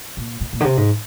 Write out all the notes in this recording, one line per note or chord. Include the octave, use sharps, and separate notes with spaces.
A#2
A#2
A#2
D3
C3
G#2